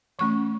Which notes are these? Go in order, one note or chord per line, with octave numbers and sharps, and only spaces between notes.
E3 A3 C#4 C#6